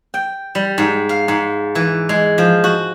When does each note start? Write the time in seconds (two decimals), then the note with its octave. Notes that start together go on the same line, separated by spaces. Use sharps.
0.14 G5
0.55 G3
0.78 G#2
1.09 F5
1.28 G#2
1.75 E3
2.09 G#3
2.38 F3
2.64 F#4